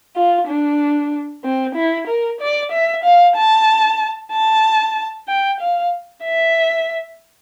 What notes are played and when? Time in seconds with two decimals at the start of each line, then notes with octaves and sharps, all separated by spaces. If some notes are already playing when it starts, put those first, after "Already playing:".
0.16 F4
0.47 D4
1.44 C4
1.75 E4
2.08 A#4
2.41 D5
2.72 E5
3.04 F5
3.36 A5
4.33 A5
5.28 G5
5.60 F5
6.24 E5